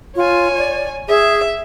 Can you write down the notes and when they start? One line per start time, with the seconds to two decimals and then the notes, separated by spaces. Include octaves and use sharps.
0.16 F4 C#5 G#5
0.58 D5
1.08 G#4 E5